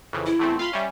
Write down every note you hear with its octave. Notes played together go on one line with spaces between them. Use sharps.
F2 C#3 E3
E4
E2 A3 C4
F4 F5 B5 C6
G3 C#4 E5